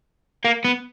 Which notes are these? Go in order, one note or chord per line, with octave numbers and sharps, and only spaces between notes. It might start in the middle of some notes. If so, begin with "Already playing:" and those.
A#3
B3